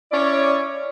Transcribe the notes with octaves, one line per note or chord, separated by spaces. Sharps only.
C#4 E4 C#5 D5